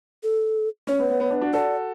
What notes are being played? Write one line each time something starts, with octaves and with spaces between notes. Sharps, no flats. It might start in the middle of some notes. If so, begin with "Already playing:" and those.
A4
C#4 C#5
B3
B3
B3
B3 D4
D4 F#4
F#4 A4 D5